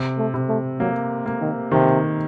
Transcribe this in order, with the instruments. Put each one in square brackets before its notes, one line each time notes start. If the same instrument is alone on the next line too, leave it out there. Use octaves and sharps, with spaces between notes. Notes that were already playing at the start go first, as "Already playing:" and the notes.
Already playing: [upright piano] C3
[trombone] A3
[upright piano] C3
[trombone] A3
[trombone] F#3 [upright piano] A#3
[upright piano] A#3
[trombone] D#3
[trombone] C3 [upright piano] D#3